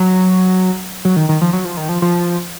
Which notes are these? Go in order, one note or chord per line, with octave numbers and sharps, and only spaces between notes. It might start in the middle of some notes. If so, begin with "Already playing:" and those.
Already playing: F#3
F#3
D#3
D#3
F3
F#3
F3
D#3
F3
F3